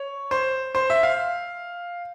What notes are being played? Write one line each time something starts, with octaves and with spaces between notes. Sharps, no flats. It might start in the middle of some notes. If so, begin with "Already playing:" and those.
Already playing: C#5
C5
C5
E5
F5